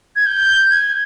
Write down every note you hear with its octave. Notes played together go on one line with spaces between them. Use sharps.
G#6
G6
G#6